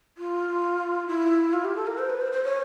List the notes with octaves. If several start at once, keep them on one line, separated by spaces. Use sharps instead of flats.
F4
E4
F4
G4
A4
A#4
C5
B4
C5
C5
C#5